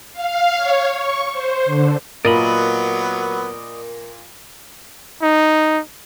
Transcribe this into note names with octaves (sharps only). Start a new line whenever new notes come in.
F5
C#5
C#6
C5
D3
A#2 F#3 B3 A#4 D5 D#5 B5
D#4